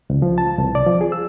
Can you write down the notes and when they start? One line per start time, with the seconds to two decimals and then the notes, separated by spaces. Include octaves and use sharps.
0.10 C#2
0.22 F3
0.38 A5
0.58 C2
0.75 D5
0.87 F3
1.01 G#4
1.12 E6